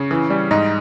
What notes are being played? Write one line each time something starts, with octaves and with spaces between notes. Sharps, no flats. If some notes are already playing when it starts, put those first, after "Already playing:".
Already playing: C#3 C#4
E3
G3
G#2 D#4